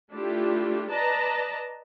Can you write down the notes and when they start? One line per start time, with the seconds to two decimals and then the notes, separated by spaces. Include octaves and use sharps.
0.10 A3 D4 E4 F4 G4
0.90 B4 D5 D#5 A5 A#5